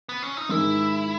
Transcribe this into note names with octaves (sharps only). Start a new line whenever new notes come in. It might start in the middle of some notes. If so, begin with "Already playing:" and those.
B3
C#4
D#4
G#2 D#3 G#3 E4